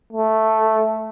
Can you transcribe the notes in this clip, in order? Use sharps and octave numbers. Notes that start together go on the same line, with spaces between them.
A3